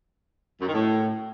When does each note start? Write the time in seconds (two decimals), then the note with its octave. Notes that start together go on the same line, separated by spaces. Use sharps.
0.60 F#2
0.67 D#3
0.73 A2